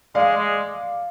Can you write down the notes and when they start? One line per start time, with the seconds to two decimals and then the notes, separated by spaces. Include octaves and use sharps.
0.15 G#3 D5 F5
0.37 G#3